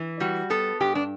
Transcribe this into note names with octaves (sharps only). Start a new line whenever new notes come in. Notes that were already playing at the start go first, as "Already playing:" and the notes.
Already playing: E3
G3 F#4
B3 A4
G2 G4
D4